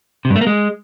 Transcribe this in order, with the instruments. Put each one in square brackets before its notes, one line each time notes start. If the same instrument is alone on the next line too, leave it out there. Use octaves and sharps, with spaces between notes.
[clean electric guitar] C3
G2
A3
A#3
G#3